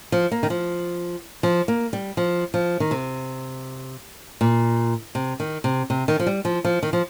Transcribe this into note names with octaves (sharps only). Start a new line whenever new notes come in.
F3
A#3
D#3
F3
F3
A#3
G3
F3
F3
D#3
C3
A#2
C3
D#3
C3
C3
D#3
F3
G3
F3
F3
D#3
F3